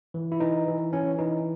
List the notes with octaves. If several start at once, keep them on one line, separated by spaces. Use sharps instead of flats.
E3
E4
E3 D#4
E3
E3 C#4
E3 D#4